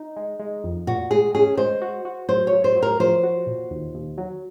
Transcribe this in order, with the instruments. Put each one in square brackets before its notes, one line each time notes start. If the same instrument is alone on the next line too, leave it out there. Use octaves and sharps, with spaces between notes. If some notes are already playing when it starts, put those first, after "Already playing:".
Already playing: [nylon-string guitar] D#4
[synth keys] G#3
G#3
F2
[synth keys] A#2 [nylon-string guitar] F#4
[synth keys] G#3 [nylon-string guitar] G#4
[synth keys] C#4 [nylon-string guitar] G#4
[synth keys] G#3 [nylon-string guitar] C5
[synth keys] F#4
F#4
[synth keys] F#3 [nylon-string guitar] C5
[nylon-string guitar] C#5
[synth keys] F#3
[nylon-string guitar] C5
[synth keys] F#3
[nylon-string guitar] A#4
[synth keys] F3 [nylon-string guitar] C5
[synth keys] F#4
A#2
D#2
D#2
F#3